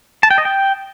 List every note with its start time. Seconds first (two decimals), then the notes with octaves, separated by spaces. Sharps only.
0.23 A5
0.31 G5
0.38 D#5
0.45 G5